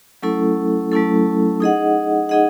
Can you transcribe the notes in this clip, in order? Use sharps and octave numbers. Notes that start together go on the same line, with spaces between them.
F#3 A3 C#4 E4 A4
F#3 A3 C#4 E4 A4
D#4 G#4 D#5 F#5
D#4 G#4 D#5 F#5